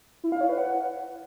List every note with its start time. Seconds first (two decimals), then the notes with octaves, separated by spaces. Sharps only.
0.24 E4
0.32 F5
0.41 C#5
0.49 B4
0.58 F#5